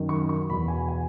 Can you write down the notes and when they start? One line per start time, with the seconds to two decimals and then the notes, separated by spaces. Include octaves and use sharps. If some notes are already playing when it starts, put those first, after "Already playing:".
Already playing: F#2 D#3
0.09 C#6
0.29 C#6
0.50 E2 B2 B5
0.68 G#5
0.88 G#5